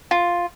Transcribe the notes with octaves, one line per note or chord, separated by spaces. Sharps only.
F4